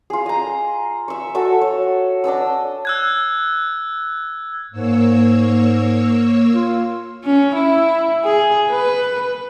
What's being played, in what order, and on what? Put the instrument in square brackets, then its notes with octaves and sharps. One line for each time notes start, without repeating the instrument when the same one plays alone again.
[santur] F4 G#4
D#5 A#5
E5 C#6
F#4 A4 E5 C#6
C#5
D4 D#5 A5 E6
[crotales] E6 F#6 G#6
[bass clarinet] G#2 [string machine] A#3 C#5 E6
[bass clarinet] F4
[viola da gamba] C#4
E4
G#4
B4